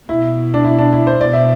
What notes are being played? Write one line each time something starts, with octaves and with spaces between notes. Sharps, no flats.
B2 E4
D4
E4
D4
E4
C5
B2 D5
E5